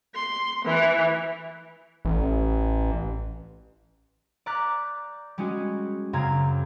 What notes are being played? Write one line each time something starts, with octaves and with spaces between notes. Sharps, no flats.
C6
E3
A1
D5 A#5 D6 F#6 G6 B6
G3 G#3 C#4 F#4 G#4
F#2 C#3 C4 A#5 G#6